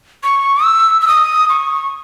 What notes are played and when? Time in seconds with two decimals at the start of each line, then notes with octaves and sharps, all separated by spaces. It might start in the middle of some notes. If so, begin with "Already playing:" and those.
0.24 C#6
0.64 E6
1.01 E6
1.07 D#6
1.49 C#6